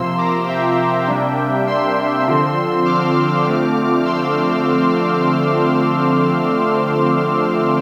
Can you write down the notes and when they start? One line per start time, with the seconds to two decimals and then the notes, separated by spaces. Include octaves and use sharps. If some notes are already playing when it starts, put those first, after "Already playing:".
Already playing: C3 F3 A#3 C6 E6
0.18 A#5 D6
0.48 E5 G5
1.08 C3 G3 A#3 D4
1.67 C6 E6
2.26 D3 F3 C4
2.85 D6 F6
3.46 D3 F3 A3 C4
4.05 C6 E6